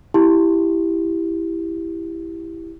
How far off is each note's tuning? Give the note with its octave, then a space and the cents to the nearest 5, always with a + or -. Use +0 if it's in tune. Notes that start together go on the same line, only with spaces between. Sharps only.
E4 +0 G4 +0